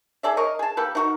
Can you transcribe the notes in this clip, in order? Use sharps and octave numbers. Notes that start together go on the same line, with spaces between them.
G#4 A4 D5 E5
A#4 C#5 D#5
G#4 A5
A#3 G4 A4 B4
D#4 F#4 A#4